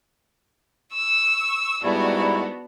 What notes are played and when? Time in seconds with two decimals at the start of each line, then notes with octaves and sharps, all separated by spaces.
0.90 C#6 E6
1.83 G#2 G3 B3 D4 E4 F#4